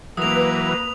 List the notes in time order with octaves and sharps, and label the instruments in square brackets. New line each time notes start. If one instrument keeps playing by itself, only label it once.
[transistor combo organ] E3 F#3 [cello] A#3 [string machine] B4 [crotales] D#6 F7